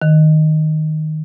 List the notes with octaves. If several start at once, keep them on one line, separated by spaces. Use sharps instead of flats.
D#3